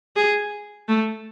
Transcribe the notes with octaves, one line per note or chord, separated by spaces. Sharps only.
G#4
A3